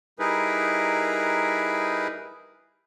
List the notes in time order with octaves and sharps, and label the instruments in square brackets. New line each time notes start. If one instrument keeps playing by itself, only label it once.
[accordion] G3 D#4 E4 G#4 A#4 B4